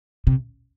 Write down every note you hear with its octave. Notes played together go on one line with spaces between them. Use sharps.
C3